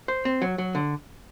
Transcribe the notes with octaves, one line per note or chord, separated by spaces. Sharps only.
C5
C4
F#3
F#3
D3